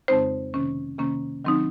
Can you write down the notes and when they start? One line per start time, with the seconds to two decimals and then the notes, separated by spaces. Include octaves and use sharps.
0.08 F2 C#3 G#3 C4 D#4 C5
0.53 C3 D#3 A#3 C#4
0.98 C3 D#3 A#3 C#4
1.44 D#3 F#3 C4 D#4